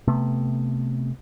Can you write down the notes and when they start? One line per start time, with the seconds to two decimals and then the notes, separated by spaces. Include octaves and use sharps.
0.08 C3 A3 B3